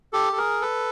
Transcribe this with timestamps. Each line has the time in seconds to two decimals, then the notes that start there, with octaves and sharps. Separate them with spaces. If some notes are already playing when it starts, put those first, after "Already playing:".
0.13 G4 A4
0.32 A4
0.37 G#4 A#4
0.62 A4 B4